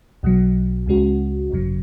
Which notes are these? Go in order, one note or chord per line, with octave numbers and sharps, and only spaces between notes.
B1 B2 F#3
C#2 C#3 G#3 C#4 F#4
G#1 F#2 C#3 F#3